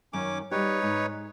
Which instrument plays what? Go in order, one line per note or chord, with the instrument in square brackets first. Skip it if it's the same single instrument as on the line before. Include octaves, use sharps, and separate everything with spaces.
[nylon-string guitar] F#2 D#3 [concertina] C#4 D6
[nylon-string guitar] G3 G4 [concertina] D#4 B4 C#5
[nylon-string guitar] G#2